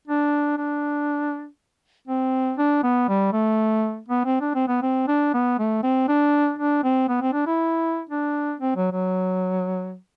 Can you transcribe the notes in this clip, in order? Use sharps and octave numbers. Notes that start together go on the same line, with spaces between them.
D4
D4
C4
D4
B3
G3
A3
B3
C4
D4
C4
B3
C4
D4
B3
A3
C4
D4
D4
C4
B3
C4
D4
E4
D4
C4
F#3
F#3